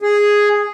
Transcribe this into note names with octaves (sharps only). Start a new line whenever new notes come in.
G#4